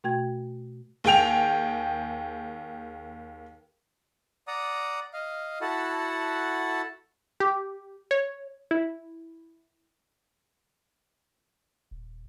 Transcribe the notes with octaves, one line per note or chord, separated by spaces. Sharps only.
B2 A3 F#4 G5 G#6
D#2 G#4 G5 F7
D5 F#5 A#5 D#6
D#5 F5
E4 F#4 A4 F#5 A5
G4
C#5
E4
D#1